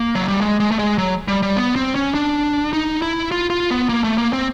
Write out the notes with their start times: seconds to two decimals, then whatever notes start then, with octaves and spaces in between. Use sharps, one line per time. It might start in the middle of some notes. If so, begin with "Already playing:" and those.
Already playing: A#3
0.15 F#3
0.28 G3
0.41 G#3
0.60 G#3
0.71 A3
0.79 G#3
0.98 F#3
1.28 G3
1.43 G3
1.57 B3
1.76 C4
1.95 C#4
2.14 D4
2.73 D#4
3.02 E4
3.32 F4
3.50 F4
3.70 B3
3.89 A#3
4.04 A3
4.18 A#3
4.33 C4